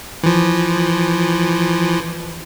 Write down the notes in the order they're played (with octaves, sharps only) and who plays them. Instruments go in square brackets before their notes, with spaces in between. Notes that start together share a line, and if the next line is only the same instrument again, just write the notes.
[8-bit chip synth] E3 F3